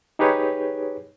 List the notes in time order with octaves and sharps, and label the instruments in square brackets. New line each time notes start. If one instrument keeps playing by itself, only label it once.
[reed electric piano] D#4 G4 G#4 B4 C#5